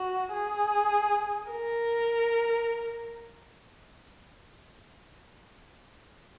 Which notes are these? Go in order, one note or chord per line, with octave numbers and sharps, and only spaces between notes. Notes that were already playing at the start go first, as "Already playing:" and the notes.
Already playing: F#4
G#4
A#4